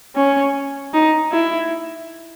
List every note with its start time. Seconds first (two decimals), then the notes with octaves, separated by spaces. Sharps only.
0.16 C#4
0.94 D#4
1.32 E4